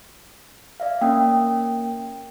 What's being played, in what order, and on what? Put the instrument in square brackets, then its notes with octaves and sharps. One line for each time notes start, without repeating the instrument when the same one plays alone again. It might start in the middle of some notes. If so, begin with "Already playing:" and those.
[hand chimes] D5 E5 F5
[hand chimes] A#3 C#4 [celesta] G5 D#6